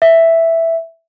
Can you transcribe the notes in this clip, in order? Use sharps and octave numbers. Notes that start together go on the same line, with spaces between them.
E5